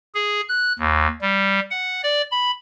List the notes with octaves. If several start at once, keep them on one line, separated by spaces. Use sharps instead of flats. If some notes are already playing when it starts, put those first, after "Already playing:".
G#4
F#6
D#2
G3
F#5
D5
B5